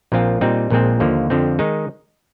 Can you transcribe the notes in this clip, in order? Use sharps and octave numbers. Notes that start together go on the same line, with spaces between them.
A#1 A#2 F3 C4 F4
A#2 G3 C4 D#4
A#1 A#2 F3 G#3 C4
D#2 D3 F3 A#3
F2 D3 F3 C4
D#3 G#3 D#4